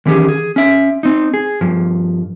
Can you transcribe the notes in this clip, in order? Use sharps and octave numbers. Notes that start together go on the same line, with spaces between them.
D#3 E3 C#4 G4 G#4
G#4
C#4 E5
C4 D#4
G#4
G2 F3